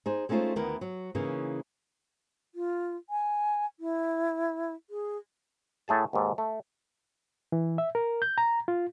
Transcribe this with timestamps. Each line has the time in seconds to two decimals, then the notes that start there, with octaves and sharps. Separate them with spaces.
0.06 D#4 G#4 C5
0.29 G#3 A3 C#4 D#4 F4 C5
0.56 D2 D#3 B3 E4 A#4
0.81 F#3
1.15 C#3 E3 A#3 C#4 D#4
2.55 F4
3.10 G#5
3.80 E4
4.90 G#4
5.88 A2 A3 G#4 A5
6.13 D#2 G#2 A4
6.38 A3
7.52 E3
7.78 E5
7.95 A#4
8.22 G6
8.38 A#5
8.68 F4